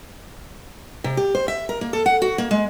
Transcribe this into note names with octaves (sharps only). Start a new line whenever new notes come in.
C3
G4
C5
E5
A#4
A#3
A4
F#5
F#4
A#3
G#3